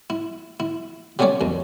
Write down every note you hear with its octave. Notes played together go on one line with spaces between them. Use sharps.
E4
E4
F#3 G3 A3 C#4 C#5 D5
B1 F2